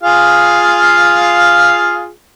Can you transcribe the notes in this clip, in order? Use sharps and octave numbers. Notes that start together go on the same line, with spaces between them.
F4 G#4 F5